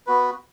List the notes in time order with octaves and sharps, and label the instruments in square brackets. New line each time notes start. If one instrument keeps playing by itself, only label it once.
[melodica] B3 F#4 B4